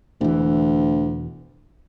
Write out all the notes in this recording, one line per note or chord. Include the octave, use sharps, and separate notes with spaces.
E1 D2 E3